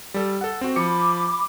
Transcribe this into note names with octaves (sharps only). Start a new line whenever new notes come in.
G3 A4
A4 F#5
C4 F#4
F3 B5 D6 C#7